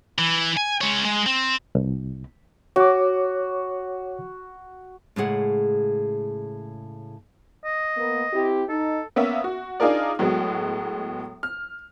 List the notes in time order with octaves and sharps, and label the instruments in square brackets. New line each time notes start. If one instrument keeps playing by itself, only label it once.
[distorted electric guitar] E3
G#5
G#3 C#5
G#3
C4
[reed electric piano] C2
[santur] F#4 [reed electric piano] C#5 D6
[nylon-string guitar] A2 C#3 G#3 G#4 F#5
[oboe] D#5
[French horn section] A#3 B3
C4 E4 G4
[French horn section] D#4 [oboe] A4
[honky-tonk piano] A#3 B3 C#4 E5
F#4
D4 D#4 F4 G#4 A#4 D5
A2 F#3 G#3 B3
F6